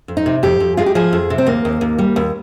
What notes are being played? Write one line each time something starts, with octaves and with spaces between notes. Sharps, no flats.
F2
D#4
C3
F2 G4
F2
G#3 F4
G4
F3 G#4
F2
C3
C4
D#2 A#3
D#2
D#2
G3
D#2